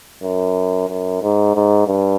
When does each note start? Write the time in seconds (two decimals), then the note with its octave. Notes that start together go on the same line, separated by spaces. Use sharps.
0.23 F#2
0.89 F#2
1.22 G#2
1.55 G#2
1.87 G2